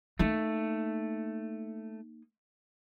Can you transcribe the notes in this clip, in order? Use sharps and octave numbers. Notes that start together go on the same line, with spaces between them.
A3 A#3 D#4